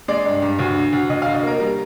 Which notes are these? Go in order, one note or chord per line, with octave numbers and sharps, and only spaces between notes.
G#3 D5
G2
G2
D2
D3
D2
D2 D#5
F5
D2
D#5
A#3 A#4
G3